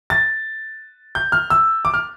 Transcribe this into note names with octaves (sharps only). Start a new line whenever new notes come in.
A6
G6
F6
E6
D6
F6